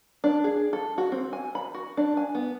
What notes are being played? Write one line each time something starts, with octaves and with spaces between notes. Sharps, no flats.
D4
G#4
A4
F#4
C4
G#5
B5
F#4
D4
G#5
B3